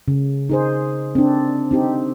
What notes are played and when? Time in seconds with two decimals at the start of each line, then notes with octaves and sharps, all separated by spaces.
0.08 C#3
0.49 D#4 G#4 C5
1.15 C4 D4
1.71 C4 D#4 G4